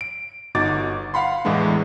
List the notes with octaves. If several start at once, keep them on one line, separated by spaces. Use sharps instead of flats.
D7
G1 D#4 F#4 D6 A6
F5 F#5 B5 C6
E2 A2 E3 G#3 B3 D4